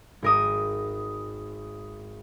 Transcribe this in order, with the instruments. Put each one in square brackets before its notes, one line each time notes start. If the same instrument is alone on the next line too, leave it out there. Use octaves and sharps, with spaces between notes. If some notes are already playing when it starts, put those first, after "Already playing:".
[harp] G#1 A#4 D#6